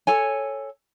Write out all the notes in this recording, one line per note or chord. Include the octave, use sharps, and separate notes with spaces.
A4 C#5 G#5